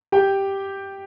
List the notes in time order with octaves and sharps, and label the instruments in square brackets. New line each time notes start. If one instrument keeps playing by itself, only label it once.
[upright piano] G4 G5